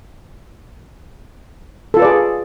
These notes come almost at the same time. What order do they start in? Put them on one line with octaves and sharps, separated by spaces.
A4 F4 B4 D5 G#4